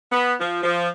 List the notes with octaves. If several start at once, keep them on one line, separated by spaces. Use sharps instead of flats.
B3
F3
F3